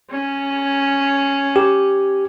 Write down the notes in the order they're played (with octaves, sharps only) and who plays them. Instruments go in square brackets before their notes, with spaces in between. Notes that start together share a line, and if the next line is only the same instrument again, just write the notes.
[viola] C#4
[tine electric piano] G4